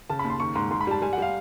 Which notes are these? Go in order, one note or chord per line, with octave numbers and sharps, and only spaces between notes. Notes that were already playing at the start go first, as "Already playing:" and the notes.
C#3 A5
D#2 B5
C6
D#3 C#6
G#2 C6
G#2 C6
B5
G3 A5
G3 G#5
F#5
G3 F5